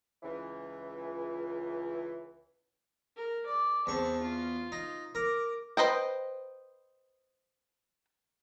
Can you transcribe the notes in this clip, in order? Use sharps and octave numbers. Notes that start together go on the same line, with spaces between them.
C#2 E3
A#4
D5
E2 C4 A5 C#6
F4
D#4
A#4 D6
B4 C5 D#5 G5